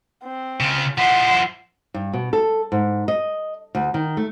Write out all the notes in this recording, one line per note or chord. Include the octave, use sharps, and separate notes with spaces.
C4
C#3 F4
F3 E4 F#5 C6
G2
B2
A4
G#2
D#5
D2
D#3
A3